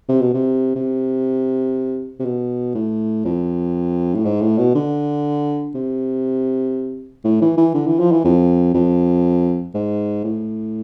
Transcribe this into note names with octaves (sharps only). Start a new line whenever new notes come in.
C3
B2
C3
C3
C3
B2
A2
F2
A2
G#2
A2
B2
D3
C3
A2
E3
E3
D3
E3
F3
E3
F2
F2
G#2
A2